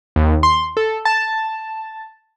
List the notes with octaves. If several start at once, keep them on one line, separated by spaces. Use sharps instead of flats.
D#2
C6
A4
A5